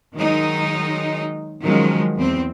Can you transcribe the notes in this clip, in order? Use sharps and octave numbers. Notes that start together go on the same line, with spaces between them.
D#3 F#3 G#3 D#4
D#3 F3 F#3 G#3 C#4
E2 C4